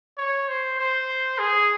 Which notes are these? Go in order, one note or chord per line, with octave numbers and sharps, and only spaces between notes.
C#5
C5
C5
G#4